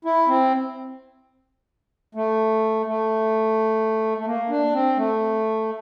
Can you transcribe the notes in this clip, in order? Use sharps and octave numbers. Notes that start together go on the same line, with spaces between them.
E4
C4
A3
A3
A3
A#3
D4
C4
A3